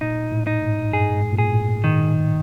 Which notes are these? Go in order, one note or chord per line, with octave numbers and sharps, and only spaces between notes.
A#2 D#4
A2
D#4
G#2
G2 G#4
G#2
A#2
A2 G#4
D#3